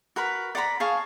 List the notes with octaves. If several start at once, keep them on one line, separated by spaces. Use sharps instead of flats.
F#4 A#4 B4 B5
D5 F#5 A#5 B5
G#4 F5 A5 C#6